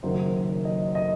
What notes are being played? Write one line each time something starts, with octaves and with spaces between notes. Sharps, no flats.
F#1 F#2 D#3 F#3 C5
D#5
D#5